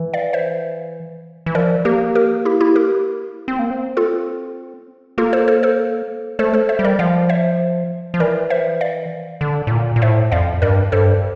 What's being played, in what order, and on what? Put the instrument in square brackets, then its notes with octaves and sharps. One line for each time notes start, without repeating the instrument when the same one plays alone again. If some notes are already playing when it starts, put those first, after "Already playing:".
Already playing: [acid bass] E3
[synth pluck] D5 F5
C5 E5
[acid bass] E3
[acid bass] F3 [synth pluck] A#4 D5
[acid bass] A#3 [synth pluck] G4 A#4
[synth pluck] G4 A#4
E4 G4
E4 G4
G4 A#4
[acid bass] C4
A#3
C4
[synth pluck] F4 A4
[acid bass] A#3 [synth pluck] F4 A4
[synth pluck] A4 C5
A4 C5
A4 C5
[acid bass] A3 [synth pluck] A4 C5
[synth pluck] A4 C5
C5 E5
[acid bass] G3
[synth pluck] A#4 D5
[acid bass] F3 [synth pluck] D5 F5
[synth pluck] C5 E5
[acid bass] F3
[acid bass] E3 [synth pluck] A#4 D5
[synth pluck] C5 E5
D5 F5
[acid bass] D3
A2
A#2
A#2
[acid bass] A2 [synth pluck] C5 E5
[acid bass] F2 [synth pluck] D5 F5
[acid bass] G2 [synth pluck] A#4 D5
[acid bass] G2 [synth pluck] A4 C5